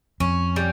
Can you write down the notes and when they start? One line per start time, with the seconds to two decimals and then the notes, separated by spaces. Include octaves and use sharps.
0.20 F2 C#4
0.56 G3